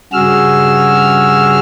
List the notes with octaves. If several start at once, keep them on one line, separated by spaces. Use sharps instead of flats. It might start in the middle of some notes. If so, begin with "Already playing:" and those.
G2 C#3 F#4 G#4 E6 F6